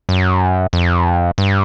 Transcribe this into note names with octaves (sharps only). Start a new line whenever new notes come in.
F#2
F2
G2